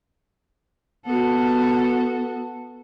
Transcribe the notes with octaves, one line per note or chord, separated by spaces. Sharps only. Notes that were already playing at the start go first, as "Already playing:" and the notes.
B3 F#4 A4